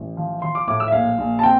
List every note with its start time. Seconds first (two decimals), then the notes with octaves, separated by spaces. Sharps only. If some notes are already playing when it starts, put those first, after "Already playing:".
Already playing: A1
0.17 F3
0.42 F3 C6
0.55 D6
0.68 A2 D6
0.80 E6
0.88 E5
0.92 A#1 F5
1.18 A#1
1.39 A5
1.43 C4 G5